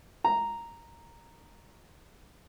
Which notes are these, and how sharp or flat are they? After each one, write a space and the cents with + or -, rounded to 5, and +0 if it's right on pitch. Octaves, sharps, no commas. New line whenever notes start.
A#5 -5